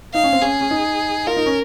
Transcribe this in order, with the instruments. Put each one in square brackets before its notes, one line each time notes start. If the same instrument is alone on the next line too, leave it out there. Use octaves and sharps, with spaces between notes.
[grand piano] D#4 [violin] F5
[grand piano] C#4
C4
[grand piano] C#4 [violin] G#4
[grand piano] C#4
D#4
[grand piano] F4 [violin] A#4
[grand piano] D#4
C#4